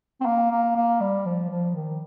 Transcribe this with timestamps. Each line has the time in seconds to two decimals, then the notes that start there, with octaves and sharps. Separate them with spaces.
0.21 C4
0.26 A#3
0.51 A#3
0.76 A#3
1.01 G3
1.26 F3
1.50 F3
1.75 D#3